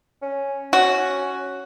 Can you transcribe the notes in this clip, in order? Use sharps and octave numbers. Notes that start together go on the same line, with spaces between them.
C#4
C#4 F#4